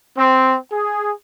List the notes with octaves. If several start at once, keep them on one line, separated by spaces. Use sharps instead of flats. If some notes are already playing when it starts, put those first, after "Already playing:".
C4
G#4